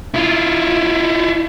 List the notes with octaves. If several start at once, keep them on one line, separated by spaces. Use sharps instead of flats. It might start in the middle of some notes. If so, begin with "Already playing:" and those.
E4 F4